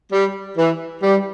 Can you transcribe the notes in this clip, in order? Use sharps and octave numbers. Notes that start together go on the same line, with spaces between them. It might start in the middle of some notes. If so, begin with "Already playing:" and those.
G3
E3
G3